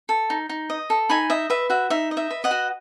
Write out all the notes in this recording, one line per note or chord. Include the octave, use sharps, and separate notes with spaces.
A4
D#4
D#4
D#5
A4
D#4 G#5 B5
D#5 E5
B4 E5
F#4 E5
D#4 E5
D#5
E5
B4
D#5 F#5
F#4